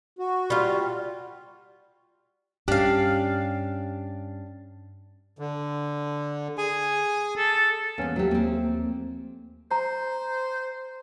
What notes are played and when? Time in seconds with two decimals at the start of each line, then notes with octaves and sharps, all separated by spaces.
0.19 F#4
0.50 G3 F4
2.68 G2 C#4 D4 G4 F5
5.39 D3
6.58 G#4 G#5
7.37 A4
7.98 E2 A#3 B3 C#4
8.16 D#2 F3 F#3 A3 G4
8.31 A#3 C4
9.71 C5 A#5